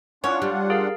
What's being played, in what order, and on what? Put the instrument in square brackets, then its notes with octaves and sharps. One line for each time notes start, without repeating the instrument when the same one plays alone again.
[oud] C#4 E4 [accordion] D4 F4 F#5 [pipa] C#5
[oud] G3
[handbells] G#4 A#4 F5